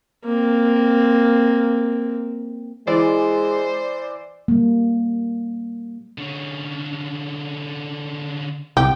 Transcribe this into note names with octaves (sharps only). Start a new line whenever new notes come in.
A#3 C4
E3 G#3 C5 D5
G3 A#3
D3 C#4
C2 G4 G5